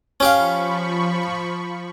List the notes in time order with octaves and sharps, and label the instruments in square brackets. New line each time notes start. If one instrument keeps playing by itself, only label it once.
[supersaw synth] F3 B5 C#6 [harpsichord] C#4 G4 F5